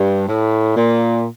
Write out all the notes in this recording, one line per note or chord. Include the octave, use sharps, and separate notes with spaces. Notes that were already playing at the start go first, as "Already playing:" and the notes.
Already playing: G2
A2
A#2